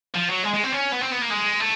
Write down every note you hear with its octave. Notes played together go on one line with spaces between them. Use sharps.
F3
F#3
G#3
G#3
C4
C#4
B3
C4
B3
A#3
G#3
A3